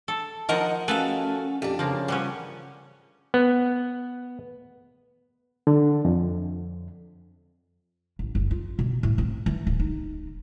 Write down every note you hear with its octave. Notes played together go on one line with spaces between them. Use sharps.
A4
D#3 F3 A#4 D#5 F#5 A#5
A3 C#4 F#4 G#4 A4 B4 F5
F2 D4 G4
C#3 F3 A#3
F3 G3 B3 C#4
B3
D3
F2
A1
F#1
F4
B2
A2
C4
E3
D1
D#4